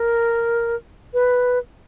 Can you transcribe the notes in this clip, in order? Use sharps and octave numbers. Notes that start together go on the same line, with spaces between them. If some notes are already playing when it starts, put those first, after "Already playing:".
Already playing: A#4
B4